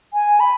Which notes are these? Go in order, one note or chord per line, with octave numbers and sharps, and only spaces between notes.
G#5
B5